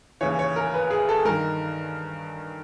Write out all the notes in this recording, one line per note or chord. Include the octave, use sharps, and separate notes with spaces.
D#2 C#3 E3 C#5
C#5
A#4
B4
G#4
A4
G2 D#3 A#4